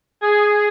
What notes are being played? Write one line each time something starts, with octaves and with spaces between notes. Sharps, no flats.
G#4